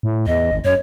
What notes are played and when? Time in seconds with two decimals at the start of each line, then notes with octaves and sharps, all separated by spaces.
0.03 A2
0.27 E2 D#5
0.51 G#1
0.65 F#2 C#5